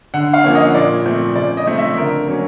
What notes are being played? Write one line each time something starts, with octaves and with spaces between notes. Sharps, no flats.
D3 F#5
F5
F3 A#3 C#4
D#5
A#2 D5
F3 A3 C4
C#3 D5
D#5
F3 A3 C4
E5
D3 A#4
F#3 A#3 C#4